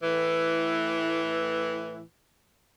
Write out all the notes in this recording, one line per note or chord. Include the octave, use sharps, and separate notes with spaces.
A2 E3